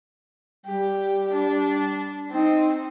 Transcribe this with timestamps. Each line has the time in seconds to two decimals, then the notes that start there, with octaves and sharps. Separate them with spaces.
0.66 G3 G4
1.32 D4
2.31 C4 D#4